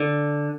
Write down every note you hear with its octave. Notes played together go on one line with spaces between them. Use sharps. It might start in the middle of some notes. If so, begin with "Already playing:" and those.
Already playing: D3